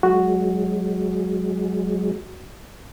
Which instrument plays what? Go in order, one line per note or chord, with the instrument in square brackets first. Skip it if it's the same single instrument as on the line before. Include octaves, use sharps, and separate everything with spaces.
[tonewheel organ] F#3 G#3 [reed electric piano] F#4